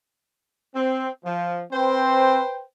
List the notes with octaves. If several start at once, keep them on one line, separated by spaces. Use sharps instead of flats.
C4
F3
C4 B4 C5 G5